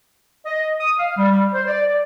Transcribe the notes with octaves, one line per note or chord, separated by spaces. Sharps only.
D#5
D#6
F5
G3
C5
D5
D5